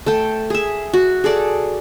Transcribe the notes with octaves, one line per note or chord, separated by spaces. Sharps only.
A3 A4 G5
G#4 E5
F#4
G#4 A4 D5